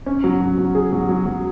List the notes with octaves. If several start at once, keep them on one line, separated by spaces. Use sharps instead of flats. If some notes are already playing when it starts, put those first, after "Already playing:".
C#4
F#3
F#3
F#3
G#4
F#3
F#3
F#3